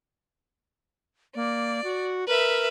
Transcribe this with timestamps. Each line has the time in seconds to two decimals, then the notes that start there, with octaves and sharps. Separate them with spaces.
1.35 A#3 D5
1.84 F#4
2.28 A#4 B4 E5